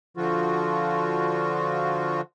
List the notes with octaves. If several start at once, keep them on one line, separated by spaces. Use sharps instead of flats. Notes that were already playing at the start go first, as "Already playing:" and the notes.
D3 F3 F4 F#4